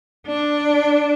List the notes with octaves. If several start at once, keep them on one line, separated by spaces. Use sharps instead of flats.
D4